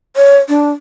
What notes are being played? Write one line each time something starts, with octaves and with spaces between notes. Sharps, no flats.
C#5
D4